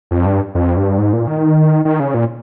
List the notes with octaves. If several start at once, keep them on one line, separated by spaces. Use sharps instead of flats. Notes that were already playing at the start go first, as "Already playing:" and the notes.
F2
G2
F2
G2
G#2
A#2
D#3
D#3
C#3
A#2